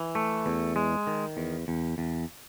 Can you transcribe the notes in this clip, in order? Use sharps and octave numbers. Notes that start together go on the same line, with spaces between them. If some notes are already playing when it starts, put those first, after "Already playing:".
Already playing: E3
A3
E2
G#3
D#3
E2
E2
E2